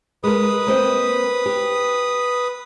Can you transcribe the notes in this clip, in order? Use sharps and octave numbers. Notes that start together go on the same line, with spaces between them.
G#3 A#4 B4 D#6
A#3 C4 D#5
G4